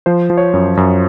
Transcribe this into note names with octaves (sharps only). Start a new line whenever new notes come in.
F3 C5
F3
C#5
F#2
F#2